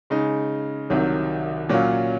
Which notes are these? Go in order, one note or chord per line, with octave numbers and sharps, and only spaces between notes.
C#3 G#3 D#4
C2 C3 D#3 F#3
A#2 F#3 C#4 F4